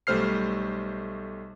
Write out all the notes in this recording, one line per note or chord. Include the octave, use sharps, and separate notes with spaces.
B1 G3 A3 C5 F6 C7